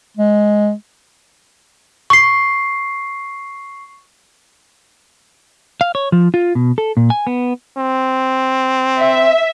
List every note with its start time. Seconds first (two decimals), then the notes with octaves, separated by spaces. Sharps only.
0.17 G#3
2.10 C#6 C7
5.81 F5
5.95 C#5
6.12 F3
6.34 F4
6.55 B2
6.78 A4
6.97 A#2
7.10 G#5
7.27 B3
7.78 C4
9.01 E5